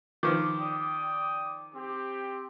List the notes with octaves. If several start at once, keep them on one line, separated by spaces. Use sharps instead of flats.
D#3 F3 D6
D5 G5 D#6
C4 G4